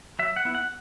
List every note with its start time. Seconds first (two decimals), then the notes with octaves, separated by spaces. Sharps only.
0.19 F#3 E5
0.36 F#5
0.45 B3 E4
0.55 F#5